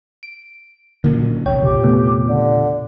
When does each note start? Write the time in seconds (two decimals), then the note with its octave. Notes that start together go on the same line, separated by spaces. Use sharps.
0.23 D7
1.04 A#2 D3 F#3 A#3 C#4
1.46 A1 E2 C3 C#5 G5
1.62 A#2 G4
1.83 C#3 A3 B3
2.26 D3